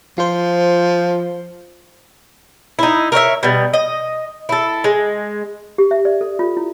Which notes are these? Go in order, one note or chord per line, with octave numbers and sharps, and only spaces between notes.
F3 F4 C5
D#4 E4
A#4 C#5 D#5 E5
B2 G3
D#5
E4 A4
G#3
G4
E5
D5
A4
F4
E4